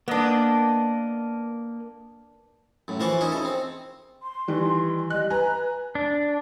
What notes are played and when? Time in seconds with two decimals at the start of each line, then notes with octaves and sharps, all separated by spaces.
0.08 A#3 B3 D4 D#5
2.88 F#2 A2
3.00 E3 F3 A#4 C5 D5 C#6
3.21 C#4 D#4 E4 A#4
3.32 C#3 A4
3.45 C4
4.22 C6
4.48 D#3 E3 G3
5.10 G3 D#5 F#6
5.30 B4 G#5 A#5
5.95 D4